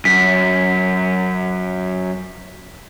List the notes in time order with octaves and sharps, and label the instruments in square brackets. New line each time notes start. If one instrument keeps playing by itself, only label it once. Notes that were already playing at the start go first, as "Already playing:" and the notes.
[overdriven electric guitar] F#2 [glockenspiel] B6